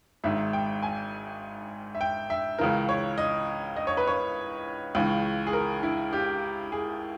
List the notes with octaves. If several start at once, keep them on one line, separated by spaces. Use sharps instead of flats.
G#1 G#2 D#3 E5
G5
G#5
E5
G5
E5
C#2 C#3 E3 A#4
C#5
D#5
D#5
C#5
B4
C#5
C#2 C#3 E3
G#4
A#4
E4
G4
G#4